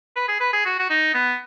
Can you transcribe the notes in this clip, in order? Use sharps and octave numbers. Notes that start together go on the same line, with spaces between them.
B4
G#4
B4
G#4
F#4
F#4
D#4
B3